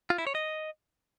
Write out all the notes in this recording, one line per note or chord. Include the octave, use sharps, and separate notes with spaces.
F4
E4
C#5
D#5